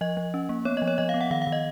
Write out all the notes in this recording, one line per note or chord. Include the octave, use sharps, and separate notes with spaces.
F3 D#5
F3
C#4
A#3
B3 C#5
D#5
F3
C#5
F3 D#5
F5
B3
F#5
D#3 F5
F5
D#3
D#5